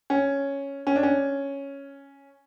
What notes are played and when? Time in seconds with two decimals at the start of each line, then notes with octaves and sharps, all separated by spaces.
0.10 C#4
0.87 C#4
0.96 D4
1.03 C#4